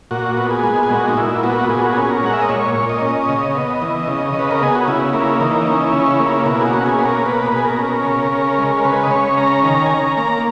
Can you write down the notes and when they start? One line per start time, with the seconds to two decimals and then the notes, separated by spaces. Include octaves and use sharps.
0.11 A#2 F#4
0.37 B3
0.51 G#4
0.63 G#3
0.83 G#4
0.90 A#2 F#4
1.09 D#4
1.17 A#2 E4
1.43 B3 F#4
1.69 A#2 G#4
1.82 F#4
1.92 G#4
1.97 C#4
2.05 G#4
2.10 A#4
2.23 G#3 F#5
2.33 E5
2.41 D#5
2.49 A#2 C#5
2.76 A#2
2.89 D#5
3.02 C#4
3.29 C#3
3.55 B3
3.82 E3
4.08 C#3
4.34 C#3
4.39 B4
4.51 A#4
4.61 B3 G#4
4.75 F#4
4.88 C#3 E4
5.13 A#3 E4
5.40 E3 D#4
5.67 C#4 D#4
5.87 E4
5.93 C#3
6.06 E4
6.19 A#3
6.26 E4
6.46 B2 E4
6.61 G#4
6.66 F#4
6.73 C#4
6.86 G#4
6.99 A#3 B4
7.05 A#4
7.25 B2 B4
7.52 B2 G#4
7.65 A#4
7.79 C#4
8.05 C#3
8.32 C#4
8.58 G#3
8.78 A#4
8.84 C#3 B4
9.03 D#5
9.11 C#3 C#5
9.37 C#4 A#5
9.63 D#3 A#5
9.86 G#5
9.91 C#4 A#5
10.17 A#3 A#5